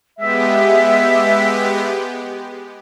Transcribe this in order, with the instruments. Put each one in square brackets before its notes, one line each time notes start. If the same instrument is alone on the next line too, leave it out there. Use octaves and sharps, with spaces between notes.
[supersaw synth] G#3 B3 G4 [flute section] E5